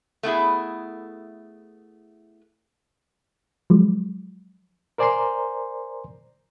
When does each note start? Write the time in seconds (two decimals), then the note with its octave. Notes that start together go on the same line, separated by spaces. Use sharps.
0.23 A3 B3 E4 G#4
3.70 F3 F#3 G#3
4.98 A#4 C5 D5 G#5 A#5 C6